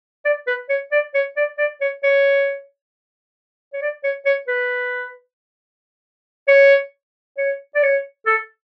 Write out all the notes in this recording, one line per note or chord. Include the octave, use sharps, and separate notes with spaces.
D5
B4
C#5
D5
C#5
D5
D5
C#5
C#5
C#5
D5
C#5
C#5
B4
C#5
C#5
D5
C#5
A4